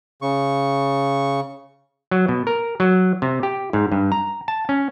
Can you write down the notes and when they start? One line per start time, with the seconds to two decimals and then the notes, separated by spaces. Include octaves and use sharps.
0.22 C#3 C#6
2.11 F#3
2.28 B2
2.47 A#4
2.80 F#3
3.22 C3
3.43 G4
3.73 G#2
3.92 G2
4.12 A#5
4.48 A5
4.69 C#4